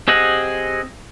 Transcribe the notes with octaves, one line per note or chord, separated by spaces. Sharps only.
C4 G4 G#4 D#5 F#5